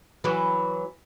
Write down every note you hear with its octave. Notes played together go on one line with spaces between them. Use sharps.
E3 F#3 F#4